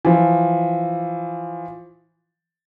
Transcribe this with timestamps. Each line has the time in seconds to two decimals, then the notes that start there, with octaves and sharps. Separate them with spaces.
0.05 E3 F3